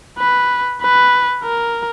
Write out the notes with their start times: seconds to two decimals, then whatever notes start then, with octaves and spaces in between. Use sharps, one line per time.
0.19 B4
0.82 B4
1.43 A#4